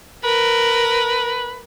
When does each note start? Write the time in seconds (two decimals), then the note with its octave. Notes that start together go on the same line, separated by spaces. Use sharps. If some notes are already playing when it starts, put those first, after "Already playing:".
0.24 A#4 B4